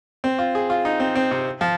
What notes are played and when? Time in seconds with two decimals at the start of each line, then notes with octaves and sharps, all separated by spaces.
0.24 C4
0.39 F4
0.55 G#4
0.70 F4
0.85 D#4
1.00 C4
1.15 C4
1.31 C3
1.61 F3